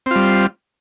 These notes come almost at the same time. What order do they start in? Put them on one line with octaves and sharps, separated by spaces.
C4 F4 G3